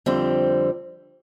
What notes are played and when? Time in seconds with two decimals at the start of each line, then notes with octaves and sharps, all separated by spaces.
0.06 F2 D3 G3 C4